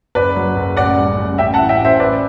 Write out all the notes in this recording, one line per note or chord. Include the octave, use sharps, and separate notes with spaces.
F#1 B4 D5
F#3
F#1
A1 D5 F#5
G3
A1
A1 E5 G5
F#5 A5
E3
E5 G5
A1
C5 E5
A1 B4 D5